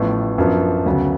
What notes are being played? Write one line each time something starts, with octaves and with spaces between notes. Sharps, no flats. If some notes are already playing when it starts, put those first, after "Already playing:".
Already playing: A1 A2 F3 B3
F#2 F3 B3 D4
D2 C#3 F#3 B3